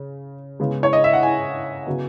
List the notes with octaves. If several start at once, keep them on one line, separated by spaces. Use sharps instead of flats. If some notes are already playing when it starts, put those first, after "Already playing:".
Already playing: C#3
C#3 G#3 B3
C#5
D#5
E5
F#5
G#5
C#3 F#3 B3